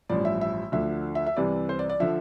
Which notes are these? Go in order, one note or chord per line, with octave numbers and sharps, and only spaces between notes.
A1 G2 F3 D5
E5
E5
D2 D3 F3 E5
E5
E5
C2 C3 E3 D5
C5
D5
D5
D3 F3 E5